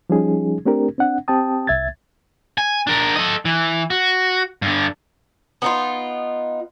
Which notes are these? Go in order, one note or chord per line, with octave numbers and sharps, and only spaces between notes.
F3 G3 C#4 D#4 G#4
A3 C4 D4 G4 A#4
C4 D4 F#5
C4 G4 G5 A5 D#6
C2 E5 G#6 A6
G#5
D4 A#4
A4 D#5
E3
F#4
G2 D3
B3 D#4 F4